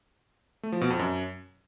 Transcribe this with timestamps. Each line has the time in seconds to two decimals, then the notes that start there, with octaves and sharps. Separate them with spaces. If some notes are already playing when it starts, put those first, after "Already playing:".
0.63 A3
0.72 F3
0.81 B2
0.90 F2
0.99 F#2